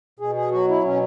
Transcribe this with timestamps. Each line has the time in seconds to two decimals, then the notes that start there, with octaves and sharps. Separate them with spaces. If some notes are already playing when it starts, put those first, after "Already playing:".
0.19 B2 G#4
0.35 G#4
0.51 F#3 F#4
0.68 E4
0.83 B2 C#4